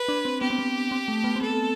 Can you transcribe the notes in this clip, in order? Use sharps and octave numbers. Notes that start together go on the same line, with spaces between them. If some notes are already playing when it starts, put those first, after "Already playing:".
Already playing: B4
D4
C4
B3 G4
C4
B3
C4
A3
B3
C4
B3 A4